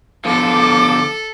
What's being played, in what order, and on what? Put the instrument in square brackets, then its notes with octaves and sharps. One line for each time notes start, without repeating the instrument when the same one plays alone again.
[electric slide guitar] D3 F3 B3 [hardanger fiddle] A4 [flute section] A5 D6